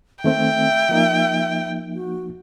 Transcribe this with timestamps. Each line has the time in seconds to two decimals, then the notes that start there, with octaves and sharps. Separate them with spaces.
0.24 D#3 A3 C4 E5 G5
0.89 F3 A#3 D#4
1.95 F#4